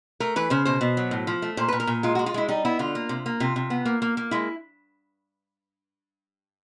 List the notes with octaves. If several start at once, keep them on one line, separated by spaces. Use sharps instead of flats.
A3 A#4
E3 B4
C#3 C5
B2 C5
B2
F#3
A2
F3
A3
A#2 C5
A#2 B4
A#4
A#2
G#3 F4
G#3 F#4
F4
G#3 E4
G3 D#4
B3 E4
D3 F4
A#3
C3
A#3
C3 F4
C3
B3
A#3
A#3
A#3
G#3 E4